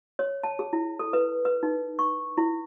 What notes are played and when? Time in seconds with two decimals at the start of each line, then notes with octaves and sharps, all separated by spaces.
0.19 C#5
0.43 A5
0.59 G#4
0.73 E4
0.99 A4
1.13 B4
1.45 B4
1.63 D#4
1.99 C#6
2.38 E4